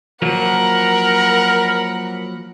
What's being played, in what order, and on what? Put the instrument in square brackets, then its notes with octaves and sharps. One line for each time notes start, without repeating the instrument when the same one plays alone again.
[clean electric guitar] F3 F#3 A#3 [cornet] A#4 [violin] F#5 B5